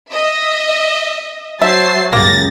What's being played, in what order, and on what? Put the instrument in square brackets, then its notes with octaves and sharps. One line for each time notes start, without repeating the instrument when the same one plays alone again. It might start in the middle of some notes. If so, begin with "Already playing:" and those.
[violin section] D#5 E5
[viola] F#3 C5 [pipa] E5 [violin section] A5 A6 C7
[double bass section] C#2 F#2 C#3 [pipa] A#3 [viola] G4 [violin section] A6 A#6